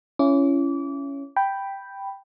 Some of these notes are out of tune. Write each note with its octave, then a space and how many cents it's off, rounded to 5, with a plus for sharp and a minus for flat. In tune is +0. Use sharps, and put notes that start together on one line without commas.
C#4 +5 E4 +35 D6 -30
G5 +0 B5 +0